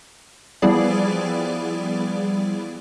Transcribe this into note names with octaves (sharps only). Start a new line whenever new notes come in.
F3 G3 B3 E4 G#4 D5